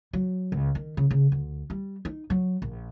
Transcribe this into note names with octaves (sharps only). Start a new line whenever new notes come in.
F#3
C#2
D#3
C#3
C#3
D2
G3
D#4
F#3
A#1